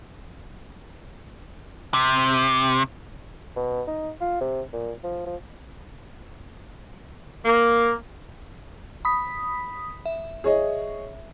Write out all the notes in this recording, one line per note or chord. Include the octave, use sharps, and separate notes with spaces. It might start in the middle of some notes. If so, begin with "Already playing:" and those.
C3
B2
D#4
F4
C3
A#2
F3
F3
A#3
B5 D#6 B6
E5
G#4 C#5 D#5